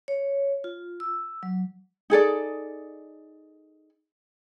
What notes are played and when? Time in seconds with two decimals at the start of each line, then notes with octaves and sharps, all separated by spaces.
0.08 C#5
0.64 F4
1.00 E6
1.43 F#3
2.10 D#4 G#4 A4 D5